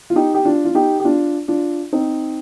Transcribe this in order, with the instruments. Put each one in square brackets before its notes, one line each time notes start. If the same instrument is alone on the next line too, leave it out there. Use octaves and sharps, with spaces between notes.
[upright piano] F4
D#4 G4
G4
D4 F4
F4
D#4 G4
G4
D4 F4
D4 F4
C4 D#4